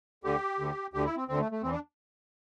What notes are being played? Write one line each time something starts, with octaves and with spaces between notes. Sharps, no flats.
D2 D3 G4
D2 D3
D2 D3 G4
E4
C4
D2 D3 C4
A3
A3
E2 E3 C4
D4